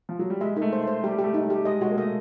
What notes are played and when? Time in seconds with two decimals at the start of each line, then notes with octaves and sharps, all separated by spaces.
0.09 F3
0.19 F#3
0.30 G3
0.41 G#3 E5
0.57 A#3 D#4
0.62 A3
0.73 C5
0.83 A3 C5
1.03 G3 G4
1.19 G4
1.24 A3
1.34 D#4
1.45 G3
1.50 G4
1.65 G#3 D#5
1.81 G#3 F#4
1.90 A#3
1.97 A3 D#5